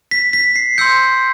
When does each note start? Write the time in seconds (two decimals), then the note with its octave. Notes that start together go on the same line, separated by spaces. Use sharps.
0.11 B6
0.33 B6
0.56 C7
0.78 C6 E6 G6 C#7